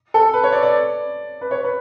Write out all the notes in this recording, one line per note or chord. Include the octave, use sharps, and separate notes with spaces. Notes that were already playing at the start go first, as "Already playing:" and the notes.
A4
B4
C#5
D5
D5
B4
C#5
B4